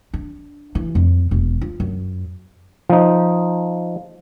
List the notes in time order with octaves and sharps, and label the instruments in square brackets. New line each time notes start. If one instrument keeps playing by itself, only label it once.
[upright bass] D4
E3
F2
E1
F4
F#2
[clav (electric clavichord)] F3 D#4